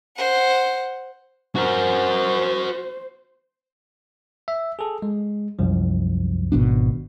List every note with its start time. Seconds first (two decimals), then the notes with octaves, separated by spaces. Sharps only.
0.16 C5 F#5
1.56 F#4 A#4 C5
4.48 E5
4.79 G#4 A4
5.02 G#3
5.59 C2 F#2 F3
6.52 G#1 B2 D4